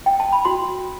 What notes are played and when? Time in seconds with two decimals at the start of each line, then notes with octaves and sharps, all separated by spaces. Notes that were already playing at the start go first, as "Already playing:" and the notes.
0.06 G5
0.20 A5
0.32 B5
0.45 F#4 C6